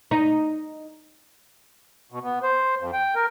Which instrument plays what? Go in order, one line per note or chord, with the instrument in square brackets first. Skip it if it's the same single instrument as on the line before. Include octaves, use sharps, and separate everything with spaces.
[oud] D#4
[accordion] B2
B3
C5
F2
G5
A#4